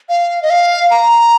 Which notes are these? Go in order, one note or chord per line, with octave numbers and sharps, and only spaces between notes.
F5
D#5
F5
A#5